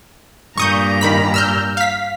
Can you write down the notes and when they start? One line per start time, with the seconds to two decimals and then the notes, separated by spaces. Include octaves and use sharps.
0.58 G2 A#2 A#5 C#6 D#6 G6
1.01 D#3 B5 B6
1.34 E6 F6 G6
1.77 F5 B6